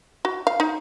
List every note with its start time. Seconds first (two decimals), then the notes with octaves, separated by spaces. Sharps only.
0.25 F#4
0.47 F5
0.60 D#4